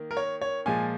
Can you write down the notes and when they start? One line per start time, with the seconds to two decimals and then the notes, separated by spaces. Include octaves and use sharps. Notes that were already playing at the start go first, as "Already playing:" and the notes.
Already playing: D#3 A#3
0.11 A#4
0.17 C#5
0.41 C#5
0.66 A#2 F3 G#3 G#5